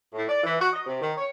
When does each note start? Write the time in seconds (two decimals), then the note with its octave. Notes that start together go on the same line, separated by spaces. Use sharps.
0.14 A2
0.29 D5
0.44 E3
0.60 F#4
0.73 D#5
0.86 C3
1.01 D#3
1.17 C#5